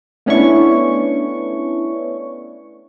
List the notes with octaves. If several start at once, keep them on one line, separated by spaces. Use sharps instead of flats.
A3 B3 C#4 D4 E4 C#6